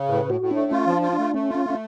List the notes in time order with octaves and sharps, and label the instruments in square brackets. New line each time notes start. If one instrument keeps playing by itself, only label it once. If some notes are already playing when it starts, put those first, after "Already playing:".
Already playing: [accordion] C#3
[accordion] A2 [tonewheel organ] B4
[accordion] A2 [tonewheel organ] F#4
[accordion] A2
[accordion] A3 [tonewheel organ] D4
[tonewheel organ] C#4 [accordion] F4
[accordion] F3 [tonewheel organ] D4
[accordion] F4
[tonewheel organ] D4
[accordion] A3
[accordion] A3 [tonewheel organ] C#4
[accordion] F4
[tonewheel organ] C#4
[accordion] A3 [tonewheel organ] C#4